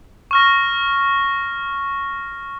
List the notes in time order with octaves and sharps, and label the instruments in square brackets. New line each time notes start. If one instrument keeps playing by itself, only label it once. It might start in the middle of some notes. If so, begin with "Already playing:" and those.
[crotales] C#6 F6 A#6